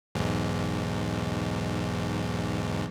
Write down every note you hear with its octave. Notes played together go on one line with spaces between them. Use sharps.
B1 E2 G#2